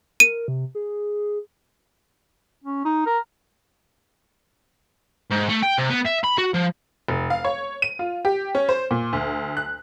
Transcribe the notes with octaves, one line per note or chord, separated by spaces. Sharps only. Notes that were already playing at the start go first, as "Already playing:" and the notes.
A#4 D#7
C3
G#4
C#4
D#4
A#4
G#2
A3
G5
C3
B3
E5
B5
F#4
F3
F1
F5
C#5
D#7
F4
G4
C#4
C5
A#2
D2
F#6